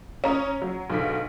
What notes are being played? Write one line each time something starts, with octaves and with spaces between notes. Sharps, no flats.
C#4 A#5 D#6
F#3
B1 G#2 D3 B6